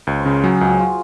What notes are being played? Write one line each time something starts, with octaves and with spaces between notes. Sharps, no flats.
C#2 C#5
C5
C#3
A#4
F#3 G#4
G#4
C#2
F#4
F4